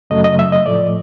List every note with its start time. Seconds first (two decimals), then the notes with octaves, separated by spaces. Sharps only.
0.10 F#2 C#3 F#3 A3 D#5
0.24 D#5
0.39 E5
0.52 D#5
0.66 A2 F3 A3 D5